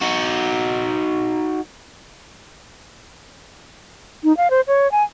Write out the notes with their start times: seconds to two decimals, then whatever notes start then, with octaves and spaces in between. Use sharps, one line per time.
0.02 D#4 F#4
4.24 D#4
4.37 F5
4.50 C5
4.68 C#5
4.92 G#5